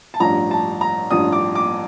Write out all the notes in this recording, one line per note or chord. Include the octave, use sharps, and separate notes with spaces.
A5
A1 G2 F3 A#5
A5
A#5
A1 G2 F3 D#6
D6
D6